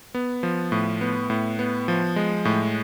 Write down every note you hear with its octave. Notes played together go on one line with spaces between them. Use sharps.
B3
F3
A2
B3
A2
B3
F3
G#3
A2